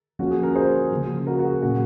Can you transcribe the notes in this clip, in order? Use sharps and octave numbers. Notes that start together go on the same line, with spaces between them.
F3 A#3 C#4 F#4
G#4
A#4
G#4 C5
C#3 F3 A#3
F#4 A#4
F#4
G#4
A#2 F#3 C#4 F#4